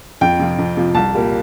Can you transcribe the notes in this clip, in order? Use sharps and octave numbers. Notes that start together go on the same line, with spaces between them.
F2 G5
C3 F3
F2
C3 F3
C2 A5
A#2 G3 A#3